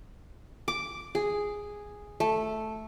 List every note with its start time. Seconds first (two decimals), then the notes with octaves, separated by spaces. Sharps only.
0.68 D6
1.15 G#4
2.20 A3